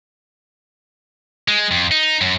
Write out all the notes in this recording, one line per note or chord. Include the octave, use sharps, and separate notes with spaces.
G#3
F2
D#4
F#2